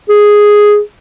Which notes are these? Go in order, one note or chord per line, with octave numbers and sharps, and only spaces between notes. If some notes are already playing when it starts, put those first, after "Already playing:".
G#4